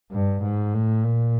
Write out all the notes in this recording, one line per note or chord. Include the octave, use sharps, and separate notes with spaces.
G2
G#2
A2
A#2